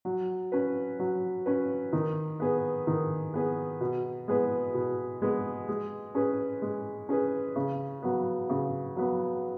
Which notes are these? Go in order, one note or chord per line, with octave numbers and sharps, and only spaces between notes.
F#3
C#4 B4
F#3
C#4 B4
D#3
B3 G#4 B4
D#3
B3 G#4 B4
B2
G#3 B3 G#4 B4
B2
G#3 B3 G#4 B4
G#3
C#4 G#4 B4
G#3
C#4 G#4 B4
C#3
F#3 B3
C#3
F#3 B3